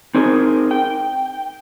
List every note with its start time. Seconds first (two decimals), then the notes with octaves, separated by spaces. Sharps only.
0.14 C4 D#4 G#4 A#4
0.71 G5